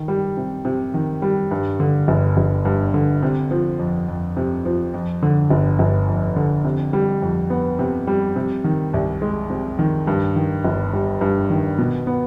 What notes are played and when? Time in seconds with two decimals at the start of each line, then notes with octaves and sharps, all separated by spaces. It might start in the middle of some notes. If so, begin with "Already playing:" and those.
Already playing: D#3
0.08 G3
0.37 C3
0.65 C3
0.94 D#3
1.22 G3
1.51 G2
1.80 D3
2.08 G1
2.37 G1
2.65 G2
2.94 D3
3.23 C3
3.51 F3
3.79 F2
4.08 F2
4.37 C3
4.65 F3
4.94 F2
5.23 D3
5.50 G1
5.79 G1
6.07 F2
6.36 D3
6.65 C3
6.93 G3
7.22 F2
7.50 B3
7.79 C3
8.07 G3
8.36 C3
8.64 D#3
8.94 C2
9.22 G#3
9.50 C3
9.79 D#3
10.07 G2
10.36 D#3
10.64 G1
10.93 G3
11.21 G2
11.50 D#3
11.78 B2
12.07 B3